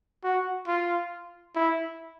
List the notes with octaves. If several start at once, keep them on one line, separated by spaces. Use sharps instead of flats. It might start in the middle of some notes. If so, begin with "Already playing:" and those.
F#4
F4
E4